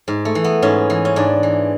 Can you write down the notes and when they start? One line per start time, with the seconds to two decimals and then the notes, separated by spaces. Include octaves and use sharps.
0.08 G#2
0.25 A3
0.35 E3
0.44 B3
0.62 G#2 C#4
0.90 E3
1.05 C#4
1.16 G#2 D4
1.43 E3